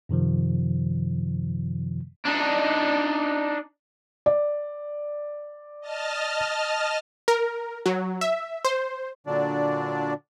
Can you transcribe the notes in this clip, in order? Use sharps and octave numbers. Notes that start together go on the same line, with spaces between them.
F#2 C3 D#3 F3
D4 D#4
D5
D#5 A5 F6
A#4
F#3
E5
C5
A#2 D3 F#3 D4 D5